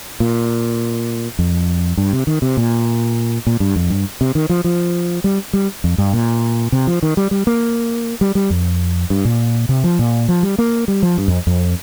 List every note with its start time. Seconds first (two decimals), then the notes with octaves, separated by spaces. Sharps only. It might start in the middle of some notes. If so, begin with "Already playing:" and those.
0.20 A#2
1.39 F2
1.97 G2
2.13 C3
2.27 D#3
2.42 C3
2.57 A#2
3.47 A#2
3.60 G2
3.76 F2
3.90 G2
4.21 C3
4.35 D#3
4.50 F3
4.64 F3
5.24 G3
5.53 G3
5.84 F2
5.98 G2
6.13 A#2
6.72 C3
6.87 F3
7.03 D#3
7.17 G3
7.31 G3
7.47 A#3
8.21 G3
8.35 G3
8.50 F2
9.10 G2
9.25 A#2
9.69 C3
9.84 F3
9.99 A#2
10.29 F3
10.43 G3
10.58 A#3
10.88 G3
11.03 F3
11.18 G2
11.28 F2
11.47 F2